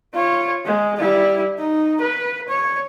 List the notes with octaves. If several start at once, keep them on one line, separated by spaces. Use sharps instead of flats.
F4 C#5
G#3
G3 E4
D#4
B4
C#5